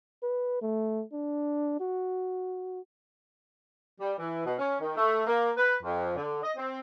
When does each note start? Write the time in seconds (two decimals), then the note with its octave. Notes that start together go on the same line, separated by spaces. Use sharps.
0.23 B4
0.62 A3
1.13 D4
1.80 F#4
4.01 G3
4.19 E3
4.45 B2
4.58 C#4
4.81 D#3
4.97 A3
5.27 A#3
5.57 B4
5.84 F2
6.16 D3
6.43 D#5
6.57 C4